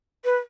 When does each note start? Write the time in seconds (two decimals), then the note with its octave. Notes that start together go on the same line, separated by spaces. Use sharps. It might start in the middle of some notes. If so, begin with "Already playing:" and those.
0.25 B4